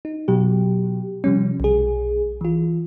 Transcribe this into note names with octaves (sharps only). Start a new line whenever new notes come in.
D#4
B2 F#3 G4
C3 F3 G3 C#4
B1 G#4
E3 F4